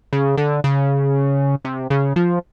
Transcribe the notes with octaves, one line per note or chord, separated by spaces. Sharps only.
C#3
D3
C#3
C3
C#3
F3